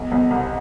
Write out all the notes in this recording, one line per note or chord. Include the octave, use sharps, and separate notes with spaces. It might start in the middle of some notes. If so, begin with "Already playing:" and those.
Already playing: B1 B2
B1 B2
C2 C3